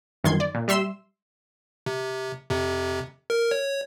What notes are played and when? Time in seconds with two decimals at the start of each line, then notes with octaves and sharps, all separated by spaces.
0.24 G1 F#2 D#3 C6 G#6
0.40 D5
0.55 A#2
0.68 G3 E5 C6 E6 E7
1.86 C3
2.50 F2 C3
3.30 A#4
3.51 C#5